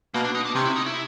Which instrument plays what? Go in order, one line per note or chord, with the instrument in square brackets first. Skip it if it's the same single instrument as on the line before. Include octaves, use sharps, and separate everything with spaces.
[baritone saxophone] B2 [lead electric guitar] A#3
[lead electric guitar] D4
D#4
D4
[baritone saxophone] C3 [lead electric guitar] C#4
[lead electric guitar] E4
D#4
E4